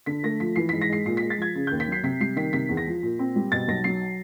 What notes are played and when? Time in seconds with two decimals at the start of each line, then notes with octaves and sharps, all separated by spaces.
0.06 D3 B6
0.23 A3 A#6
0.40 F3 B6
0.56 E3 C7
0.69 B6
0.73 G#2
0.81 A#6
0.89 G#3 C7
1.06 A#2 C7
1.17 B6
1.22 G#3
1.30 A6
1.38 F3 G#6
1.55 C#3
1.67 G6
1.71 D#2
1.80 B6
1.88 F#3 C7
2.03 C3 B6
2.20 G3 C7
2.36 D#3 B6
2.53 C3 B6
2.69 E2
2.77 A#6
2.87 F3
3.03 A#2
3.19 C4
3.36 G3
3.52 B2 A6
3.68 B1 A#6
3.84 F#3 C7